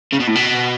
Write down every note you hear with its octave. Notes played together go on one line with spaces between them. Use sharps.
C#3
B2
A2
B2